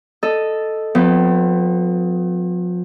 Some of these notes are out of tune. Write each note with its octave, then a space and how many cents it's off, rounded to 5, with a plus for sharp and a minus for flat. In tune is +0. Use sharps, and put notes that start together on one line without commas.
A4 +0 D#5 +0
F3 +40 C4 -45 B4 +0